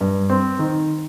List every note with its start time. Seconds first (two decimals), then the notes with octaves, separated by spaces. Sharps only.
0.01 G2
0.30 C4
0.59 D#3